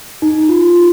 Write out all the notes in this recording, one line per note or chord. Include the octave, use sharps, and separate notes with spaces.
D#4
F4